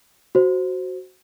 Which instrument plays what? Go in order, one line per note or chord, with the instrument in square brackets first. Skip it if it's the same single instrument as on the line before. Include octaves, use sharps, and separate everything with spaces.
[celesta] F#4 C5